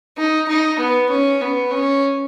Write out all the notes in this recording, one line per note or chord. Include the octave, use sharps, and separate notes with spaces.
D#4
D#4
B3
C#4
B3
C#4